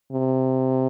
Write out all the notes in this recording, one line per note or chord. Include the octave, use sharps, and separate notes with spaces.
C3